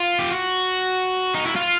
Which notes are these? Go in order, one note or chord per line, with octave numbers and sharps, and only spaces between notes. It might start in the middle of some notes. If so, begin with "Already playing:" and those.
Already playing: F4
G4
F#4
D#4
E4
F4